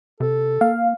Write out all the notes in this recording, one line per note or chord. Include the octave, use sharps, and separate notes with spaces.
C3 A4
A#3 F5